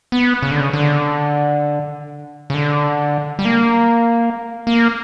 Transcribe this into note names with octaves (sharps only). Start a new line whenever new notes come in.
B3
C#3
D3
C#3
D3
C#3
D3
G3
A#3
A#3